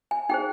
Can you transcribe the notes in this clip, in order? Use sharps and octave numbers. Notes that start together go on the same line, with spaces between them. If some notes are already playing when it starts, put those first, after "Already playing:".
G#5
D#4 G#4 C5 G5